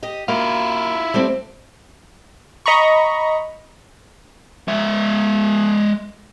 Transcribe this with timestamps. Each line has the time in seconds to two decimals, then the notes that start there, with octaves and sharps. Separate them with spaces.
0.03 G4 D#5
0.28 A#3 E4 F4
1.14 G3 A3 C4
2.66 D#5 A#5 B5 C#6
4.68 G#3 E5